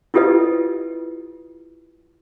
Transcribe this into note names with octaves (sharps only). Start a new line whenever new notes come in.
E4 F4 G4 A4 B4 D#5